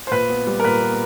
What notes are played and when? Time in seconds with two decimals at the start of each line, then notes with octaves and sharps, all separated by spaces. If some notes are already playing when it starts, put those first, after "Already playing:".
0.07 C5
0.11 A#2 B4
0.30 B3
0.47 G3
0.60 A#4
0.64 A#2 B4
0.82 B3